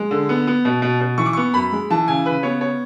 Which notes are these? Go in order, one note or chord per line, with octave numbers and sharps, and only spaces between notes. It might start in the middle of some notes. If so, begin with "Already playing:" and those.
Already playing: G#3
D3
B3
B3
B2
B2
B2
E3 C#6
D6
B3 C#6
F#2 B5
G#3
E3 A5
C#3 G#5
C#3 B4
B3 C#5
C#5